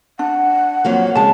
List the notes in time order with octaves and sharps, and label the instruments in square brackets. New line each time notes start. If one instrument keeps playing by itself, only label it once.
[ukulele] D4 [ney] F#5
[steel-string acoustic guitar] F2 F#3 A#3
[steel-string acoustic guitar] C#3 G#3 [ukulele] A5